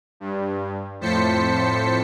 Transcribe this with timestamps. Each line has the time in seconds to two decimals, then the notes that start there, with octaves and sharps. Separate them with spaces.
0.20 G2
1.00 F2 A2 C5 A5 B6 C#7